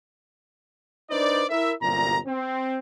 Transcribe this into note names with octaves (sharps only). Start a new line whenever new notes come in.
D4 D#4 B4 C5 D5
E4 A#4 E5
G1 C2 F#2 A#2 A#5
C4